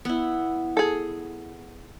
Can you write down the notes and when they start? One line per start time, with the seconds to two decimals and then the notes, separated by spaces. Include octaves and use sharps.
0.05 B3 E4
0.77 G#4 A4